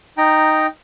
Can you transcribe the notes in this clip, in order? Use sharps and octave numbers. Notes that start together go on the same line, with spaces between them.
D#4 G5 A#5